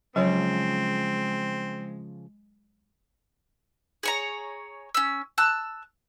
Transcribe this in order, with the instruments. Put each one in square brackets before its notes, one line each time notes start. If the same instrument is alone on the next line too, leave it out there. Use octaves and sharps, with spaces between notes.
[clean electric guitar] C#3 F3 [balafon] F#3 C#5 [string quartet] G#3 [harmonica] C4
[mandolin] G#4 C#5 A#5
C#4 E6
A5 E6 F#6